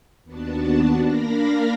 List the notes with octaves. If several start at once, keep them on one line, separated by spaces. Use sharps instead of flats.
D#2 B3 D4 F#4 A5
A#3 D4 A#4 F5 B5 A#6